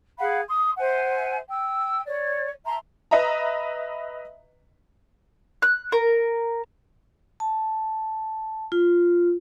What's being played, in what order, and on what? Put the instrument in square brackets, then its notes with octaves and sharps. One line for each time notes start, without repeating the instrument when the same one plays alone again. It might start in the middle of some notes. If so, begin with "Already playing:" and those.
[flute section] G#4 F5 F#5 B5
C6 D#6
C5 E5 F#5 G#5
G5 E6
C#5 D5
E5 A5 A#5 C6
[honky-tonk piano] B4 D#5 E5 A#5
[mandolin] F#6
A#4
[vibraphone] A5
F4